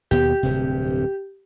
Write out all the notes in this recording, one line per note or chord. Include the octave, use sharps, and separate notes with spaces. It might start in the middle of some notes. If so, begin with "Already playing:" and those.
D#2 B2 B3 G4
D1 G2 C3